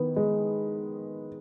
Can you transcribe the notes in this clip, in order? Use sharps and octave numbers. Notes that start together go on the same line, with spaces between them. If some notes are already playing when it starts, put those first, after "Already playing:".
Already playing: D#3 B3
G#3